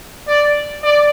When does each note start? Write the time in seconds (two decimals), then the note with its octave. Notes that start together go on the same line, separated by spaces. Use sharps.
0.26 D5
0.82 D5